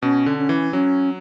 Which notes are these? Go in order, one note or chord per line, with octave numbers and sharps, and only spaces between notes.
B2 C#4
D3
C#4
E3
F#3 C#4